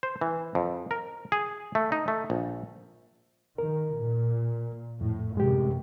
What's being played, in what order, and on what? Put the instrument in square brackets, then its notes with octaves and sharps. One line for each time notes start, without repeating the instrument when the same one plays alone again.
[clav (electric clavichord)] C5
E3
F2
A#4
G#4
A3
D#4
A3
A#1
[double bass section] D#3 [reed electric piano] A#4
[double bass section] A#2
[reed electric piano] F2 [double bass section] A2
[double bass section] A1 F#2 C3 [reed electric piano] G#3 G4